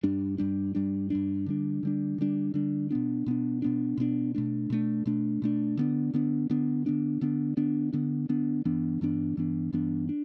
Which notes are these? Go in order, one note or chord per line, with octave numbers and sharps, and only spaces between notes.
G2 G3 D4
G2 G3 D4
G2 G3 D4
G2 G3 D4
D3 G3 D4
D3 G3 D4
D3 G3 D4
D3 G3 D4
B2 B3 D4
B2 B3 D4
B2 B3 D4
B2 B3 D4
B2 A3 D4
B2 A3 D4
B2 A3 D4
B2 A3 D4
D3 B3 D4
D3 B3 D4
D3 B3 D4
D3 B3 D4
D3 B3 D4
D3 B3 D4
D3 B3 D4
D3 B3 D4
G2 E3 B3 D4
G2 E3 B3 D4
G2 E3 B3 D4
G2 E3 B3 D4
D4